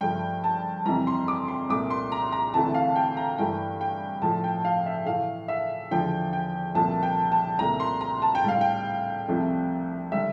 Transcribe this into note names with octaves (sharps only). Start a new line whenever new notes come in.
G2 F3 A3 G5
A5
F2 C3 E3 G3 A#5
C6
D6
C6
C2 A#2 A3 D6
C6
A#5
A#5
D2 C3 E3 A3 A5
F5
G5
A#5
G2 E3 A3 G5
G5
A2 F3 A3 A5
G5
F5
E5
A2 E3 A3 F5
E5
E2 D3 F3 G5
G5
C2 A#2 F3 A3 A5
G5
A5
C2 A#2 A3 A#5
C6
A#5
A5
G5
A2 G3 F5
G5
C2 C3 F3 A3
D3 G3 E5